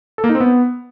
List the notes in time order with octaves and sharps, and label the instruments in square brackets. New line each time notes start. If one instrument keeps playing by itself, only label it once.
[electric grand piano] A4
A#3
D#4
C4
B3